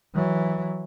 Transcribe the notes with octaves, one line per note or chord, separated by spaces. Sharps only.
E3 F#3